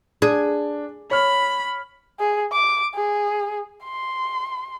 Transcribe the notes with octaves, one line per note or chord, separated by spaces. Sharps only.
D4 G#4
C#5 B5 F6
G#4
D6
G#4
C6